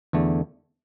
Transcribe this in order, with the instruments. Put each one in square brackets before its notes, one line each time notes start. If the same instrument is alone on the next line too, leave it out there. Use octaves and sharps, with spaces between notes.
[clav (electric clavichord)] E2 D3 A3